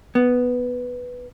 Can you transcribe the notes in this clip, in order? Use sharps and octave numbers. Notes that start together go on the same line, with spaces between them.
B3